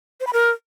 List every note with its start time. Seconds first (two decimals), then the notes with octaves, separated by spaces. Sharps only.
0.20 C5
0.27 B5
0.33 A#4